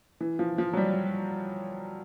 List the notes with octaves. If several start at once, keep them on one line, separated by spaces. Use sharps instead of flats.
E3
F3
F3
F#3
G3